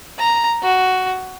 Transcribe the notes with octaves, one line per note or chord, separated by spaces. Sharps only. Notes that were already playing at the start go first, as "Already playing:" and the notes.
A#5
F#4